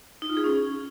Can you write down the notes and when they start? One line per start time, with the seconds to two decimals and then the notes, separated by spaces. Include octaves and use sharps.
0.22 D#4
0.29 F4
0.37 G#4
0.44 C#4